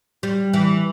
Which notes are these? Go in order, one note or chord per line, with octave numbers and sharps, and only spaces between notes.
G3
E3